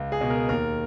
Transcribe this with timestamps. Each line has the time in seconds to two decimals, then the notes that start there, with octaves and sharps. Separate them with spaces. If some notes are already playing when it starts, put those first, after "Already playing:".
Already playing: C#2
0.12 G#4
0.21 B2
0.30 A#4
0.49 D#2 A#4